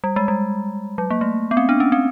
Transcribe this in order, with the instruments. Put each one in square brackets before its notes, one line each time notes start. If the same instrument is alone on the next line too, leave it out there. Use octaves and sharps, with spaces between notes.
[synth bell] G3
G#3
G3
F#3
A#3
A3
B3
C4
D4
C#4
C4